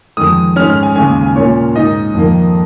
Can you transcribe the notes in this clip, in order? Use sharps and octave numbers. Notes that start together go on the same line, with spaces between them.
F2 D#3 G#3 D#6
G#2 G#3 C#4 F6
F6
G#5
D#2 C#3 G#3 G#5
G#5
A#2 A#3 C#4 C#5
G#2 G#3 D#4 D#5
F2 D#3 A#3